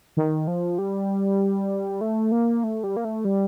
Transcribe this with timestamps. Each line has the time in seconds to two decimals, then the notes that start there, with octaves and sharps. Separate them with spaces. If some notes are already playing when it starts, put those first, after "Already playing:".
0.17 D#3
0.47 F3
0.78 G3
2.01 A3
2.32 A#3
2.64 A3
2.84 G3
2.96 A#3
3.05 A3
3.25 G3